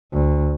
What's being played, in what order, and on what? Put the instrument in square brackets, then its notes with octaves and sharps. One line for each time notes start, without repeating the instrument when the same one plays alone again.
[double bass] D2